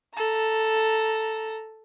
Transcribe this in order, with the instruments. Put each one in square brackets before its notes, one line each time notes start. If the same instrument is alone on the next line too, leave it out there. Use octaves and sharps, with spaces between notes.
[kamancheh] A4 A#5